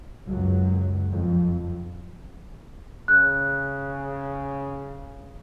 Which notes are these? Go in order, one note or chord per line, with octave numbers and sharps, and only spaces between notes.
C#2 F#2 F#3
F2 F3
C#3 F#6